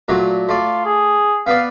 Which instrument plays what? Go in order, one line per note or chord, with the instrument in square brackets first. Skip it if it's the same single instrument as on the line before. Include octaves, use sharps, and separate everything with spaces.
[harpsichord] A#2 F#3 A3
[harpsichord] A3 D5 [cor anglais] F4
[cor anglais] G#4
[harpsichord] B3 B4 D5 [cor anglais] F5